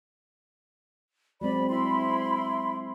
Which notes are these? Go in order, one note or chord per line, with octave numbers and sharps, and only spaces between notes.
F#3 G#3 C4 D5 B5
E4 B5 C6